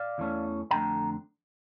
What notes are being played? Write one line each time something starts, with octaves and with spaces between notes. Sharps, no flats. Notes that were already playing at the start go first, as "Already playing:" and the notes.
Already playing: D5 F5
E2 E3 A3 C#4
F2 D3 A3 D4 G5 A#5